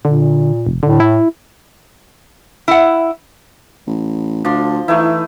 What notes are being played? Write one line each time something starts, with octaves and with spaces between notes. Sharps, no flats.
A#2 D3
F1
A2 D3
E4
E4 F#5
A1
D2 F3 D4 C6
E3 A3 D#4 E4